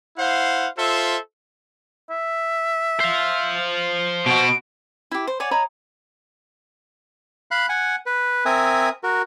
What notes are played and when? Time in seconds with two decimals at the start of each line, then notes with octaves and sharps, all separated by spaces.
0.17 E4 C5 F5 F#5
0.77 F4 A4 C5 E5
2.10 E5
3.00 C5 F5
4.26 B2 F#4 D7
5.12 E4 G4
5.27 C5
5.40 C#5 D5 F#5 G#5
5.51 C#5 D#5 A#5 B5
7.51 F5 B5 F#6
7.69 F#5 G#5
8.06 B4
8.45 C4 A#4 E5 G#5 D#6
9.03 F#4 A#4